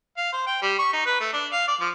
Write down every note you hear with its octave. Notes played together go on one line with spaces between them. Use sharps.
F5
C5
G5
G3
C#6
D#4
B4
A3
D4
F5
D5
F3